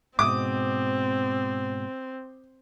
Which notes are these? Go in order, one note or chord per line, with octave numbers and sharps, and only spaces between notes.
G#2 B2 C4 D6 D#6